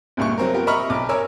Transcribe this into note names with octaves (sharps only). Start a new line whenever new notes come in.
G1 C#2 G2 A#2 C#6
F#3 C4 A#4
B3 C4 F4 G4 A#4
D#5 E5 A#5 B5 C#6 F6
B1 D6
A#4 C#5 G#5 E6